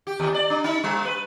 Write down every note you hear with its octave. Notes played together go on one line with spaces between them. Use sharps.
G4
D#2
D5
D4
D#4
G3
B4